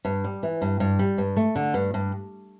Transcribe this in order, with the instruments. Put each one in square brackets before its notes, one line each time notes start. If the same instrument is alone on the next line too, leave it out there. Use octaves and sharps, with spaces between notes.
[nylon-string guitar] G2
G3
E3
G2
G2
G3
G2
A3
D3
G2
G2